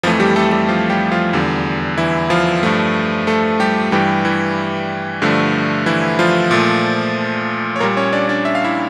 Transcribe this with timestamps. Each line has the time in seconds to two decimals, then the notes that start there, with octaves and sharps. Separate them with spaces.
0.03 F2 E3 F3 A3 F4
0.20 G3 G4
0.36 A3 A4
0.52 G3 G4
0.69 F3 F4
0.90 G3 G4
1.12 F3 F4
1.33 E2 D3 G3
1.98 E3 E4
2.30 F3 F4
2.63 G2 F3 A3
3.27 A3 A4
3.60 G3 G4
3.92 G2 E3 G3 G4
4.25 E3 E4
5.22 G2 D3 F3 A3
5.86 E3 E4
6.19 F3 F4
6.51 A#2 A3
7.76 C#5
7.80 A#2 G3 A#3 A#4
7.97 C#4 C#5
8.13 D4 D5
8.29 D4 D5
8.45 E5
8.55 F5
8.64 E4 E5